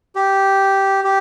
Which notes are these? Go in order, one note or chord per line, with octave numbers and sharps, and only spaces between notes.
G4
G4